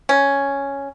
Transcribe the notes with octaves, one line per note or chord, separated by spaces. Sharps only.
C#4